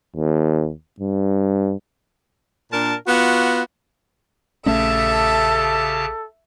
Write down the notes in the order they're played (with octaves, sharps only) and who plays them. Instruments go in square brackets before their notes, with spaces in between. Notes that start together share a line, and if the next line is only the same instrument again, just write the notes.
[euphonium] D#2
G2
[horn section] A#2 D4 A#4 A5
B3 F4 F#4
[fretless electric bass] A#1 A3 C#4 [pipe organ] C#3 G4 A5 [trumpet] A4 [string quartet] E5